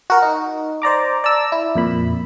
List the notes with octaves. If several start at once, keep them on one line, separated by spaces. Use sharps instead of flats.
F#4 A#4
D#4
C5 D5 A#5 D6
D5 A5 A#5 E6
E4
F2 A#2 B5